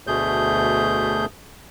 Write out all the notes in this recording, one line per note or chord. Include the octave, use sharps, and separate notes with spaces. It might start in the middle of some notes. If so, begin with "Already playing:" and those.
D2 B2 A3 G#4 G6